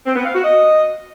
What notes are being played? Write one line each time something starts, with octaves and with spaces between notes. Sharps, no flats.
C4
B3
F5
F#4
D#5